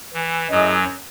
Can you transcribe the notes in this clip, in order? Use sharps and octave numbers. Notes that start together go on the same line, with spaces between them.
E3
F#2 F#3 A3 E4 G#4 D#5